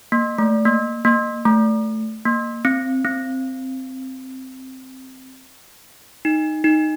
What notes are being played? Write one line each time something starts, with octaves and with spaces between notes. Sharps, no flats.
A#3
A3
A#3
A#3
A3
A#3
C4
C4
D#4
D#4